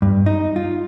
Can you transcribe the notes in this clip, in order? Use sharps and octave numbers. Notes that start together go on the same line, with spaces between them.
G2
D#4
F4